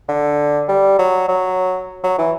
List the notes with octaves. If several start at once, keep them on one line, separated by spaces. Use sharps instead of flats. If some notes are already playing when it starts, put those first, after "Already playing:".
D3
G3
F#3
F#3
F#3
E3